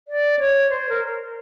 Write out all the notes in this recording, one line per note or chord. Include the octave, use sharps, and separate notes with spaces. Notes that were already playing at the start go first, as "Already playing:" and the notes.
D5
C#5
C5
A#4